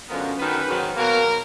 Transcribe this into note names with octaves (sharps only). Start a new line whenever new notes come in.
F#2 D3 F3 G#3 B3 A#4
F#2 D#3 F#3 B3 B4
G#2 D#3 F#3 B3
B2 F#3 A#3 A#4